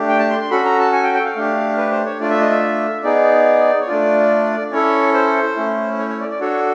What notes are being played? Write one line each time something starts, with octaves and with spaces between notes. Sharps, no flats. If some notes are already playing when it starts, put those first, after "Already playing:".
Already playing: A3 D4 G4
G5
A5
C6
C6
C#4 F#4 A4 B5
A#5
A5
G#5
G5
G5
F5
A3 D4 G4
B4
C5
C#5
A3 D4 F4 D5
E5
D#5
E5
B3 D#4 G#4 D5
C#5
A3 D4 F4 D5
C#4 E4 A4 C#5
C5
A3 C#4 E4
C#5
C#5
D5
D5
D4 F#4 A4 C#5